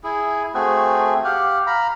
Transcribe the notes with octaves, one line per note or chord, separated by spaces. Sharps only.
E4 G#4
A3 C4 F#4 G#4
G4 F5 F#5
F5 A#5 B5